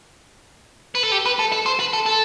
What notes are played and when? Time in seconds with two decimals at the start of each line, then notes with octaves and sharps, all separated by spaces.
0.95 B4
1.03 A4
1.12 G4
1.26 B4
1.39 A4
1.52 A4
1.66 C5
1.80 B4
1.93 A4
2.06 A4